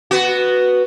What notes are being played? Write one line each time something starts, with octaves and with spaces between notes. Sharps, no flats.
B3 F#4